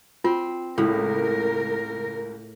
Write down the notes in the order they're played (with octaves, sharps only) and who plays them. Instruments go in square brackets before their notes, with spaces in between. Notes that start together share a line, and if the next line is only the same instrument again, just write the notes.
[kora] C4 [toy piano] F4
[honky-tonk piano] C#2 [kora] A2 [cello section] A#4